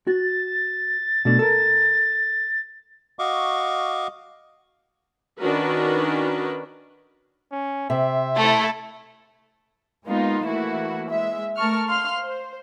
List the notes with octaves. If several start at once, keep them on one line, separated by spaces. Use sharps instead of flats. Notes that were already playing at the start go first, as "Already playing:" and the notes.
F#4 A6
B2 A3 D4
A4 A#4
F#4 D#5 F5 C#6 D6
D#3 C#4 D4 F#4 A#4 B4
C#4
C3 E5
A3 E4 A4
G#3 A#3 B3 D#4 F4
E3 A3 A#3 E4 F#4
G#3 E5
A3 A#4 A5 C#6 F6
F5 C6 F6
C5